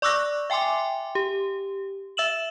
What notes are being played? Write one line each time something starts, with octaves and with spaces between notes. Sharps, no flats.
D5 C#6 D6 E6 F#6 A#6
E5 G5 G#5 C6 D6
G4
E5 E6 E7 F#7